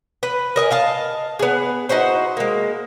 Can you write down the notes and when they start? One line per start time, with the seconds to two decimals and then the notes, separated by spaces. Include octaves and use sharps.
0.23 B4
0.56 A#4 D#5 G#5
0.71 D#5 F5 A5
1.39 B3 G#4
1.89 D#4 E4 F#4 C5
2.37 G#3 A#3